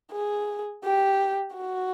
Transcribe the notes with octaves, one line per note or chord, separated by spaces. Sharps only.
G#4
G4
F#4